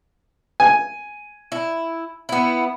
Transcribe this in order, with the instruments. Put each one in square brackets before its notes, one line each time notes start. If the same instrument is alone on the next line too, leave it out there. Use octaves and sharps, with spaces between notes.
[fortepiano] G#5
[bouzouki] E4
B3 E4